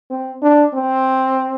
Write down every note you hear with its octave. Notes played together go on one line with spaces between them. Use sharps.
C4
D4
C4